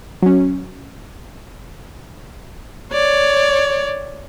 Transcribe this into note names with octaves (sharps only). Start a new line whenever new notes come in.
F#3 C#4
C#5 D5